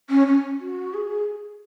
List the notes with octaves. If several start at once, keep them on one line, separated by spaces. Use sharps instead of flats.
C#4
C#4
F#4
G#4